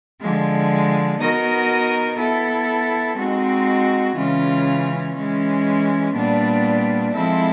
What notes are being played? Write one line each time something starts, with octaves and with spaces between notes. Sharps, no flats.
D3 F3 G#3
B3 D#4 F#4 A#4 D#5
B3 E4 A4
G#3 C4 D#4 F#4
C#3 E3 G#3 C#4 F4
E3 G#3 C#4
A#2 G3 B3 D4
F3 G#3 C4 E4 A4